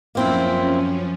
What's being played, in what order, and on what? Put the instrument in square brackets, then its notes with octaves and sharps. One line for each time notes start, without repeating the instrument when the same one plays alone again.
[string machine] F#2 F3 C#4 [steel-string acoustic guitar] A#3 C4 E4